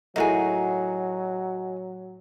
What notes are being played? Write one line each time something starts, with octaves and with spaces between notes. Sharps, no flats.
A2 F#3 D#4 F#4 G#4 A#4